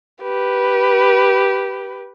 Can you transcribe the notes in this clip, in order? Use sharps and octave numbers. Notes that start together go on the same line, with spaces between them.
G4 B4